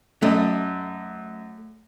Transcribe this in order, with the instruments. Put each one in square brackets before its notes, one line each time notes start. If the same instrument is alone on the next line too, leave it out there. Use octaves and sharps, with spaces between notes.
[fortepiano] F#2 D#5 [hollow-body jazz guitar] A3